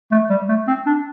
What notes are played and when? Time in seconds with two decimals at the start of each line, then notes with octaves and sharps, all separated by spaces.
0.12 A3
0.30 G3
0.49 A3
0.68 C4
0.86 D4